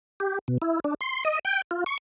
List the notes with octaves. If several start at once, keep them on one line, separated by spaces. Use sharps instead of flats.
G4
B2
E4
D4
C6
D#5
G5
F4
C#6